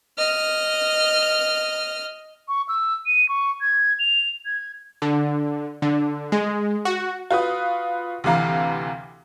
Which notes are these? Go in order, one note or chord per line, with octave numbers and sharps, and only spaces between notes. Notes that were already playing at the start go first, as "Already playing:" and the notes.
D#5 F6
C#6
E6
D#7
C#6
G#6
F7
G#6
D3
D3
G#3
F#4
F4 F#4 B4 D#6
D2 C3 E3 F5 A#5